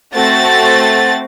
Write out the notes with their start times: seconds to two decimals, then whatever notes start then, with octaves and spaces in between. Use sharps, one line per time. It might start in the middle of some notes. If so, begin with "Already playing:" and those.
0.16 A3 C4 F#4 A6